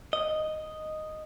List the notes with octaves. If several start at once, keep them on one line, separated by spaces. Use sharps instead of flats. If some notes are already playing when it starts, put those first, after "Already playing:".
D#5